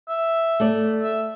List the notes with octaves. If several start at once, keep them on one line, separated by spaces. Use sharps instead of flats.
E5
A3 D5
E5